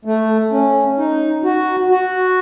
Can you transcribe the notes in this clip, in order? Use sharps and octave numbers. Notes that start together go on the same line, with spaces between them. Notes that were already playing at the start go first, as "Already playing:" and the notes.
A3
C#4
D#4
F#4
F#4